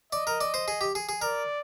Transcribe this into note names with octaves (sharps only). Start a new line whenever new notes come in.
D5 D#5
A#4
D5
C5
G#4
G4
G#4
G#4
A#4 D5